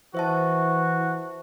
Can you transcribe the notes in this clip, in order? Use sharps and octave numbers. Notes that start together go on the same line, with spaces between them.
E3 F#4 C5 E5 A5